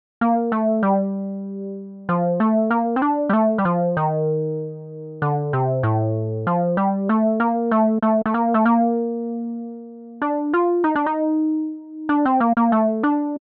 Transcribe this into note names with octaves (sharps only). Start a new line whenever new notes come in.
A#3
A3
G3
F3
A3
A#3
C4
D4
G3
A3
G3
F3
D#3
D3
C3
A2
F3
G3
A3
A#3
A3
A3
A3
A#3
A3
A#3
D4
F4
D#4
D4
D#4
D4
C4
A#3
A#3
A3
D4